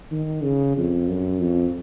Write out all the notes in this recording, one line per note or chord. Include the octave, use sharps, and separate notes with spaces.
D#3
C#3
F2
F#2
F2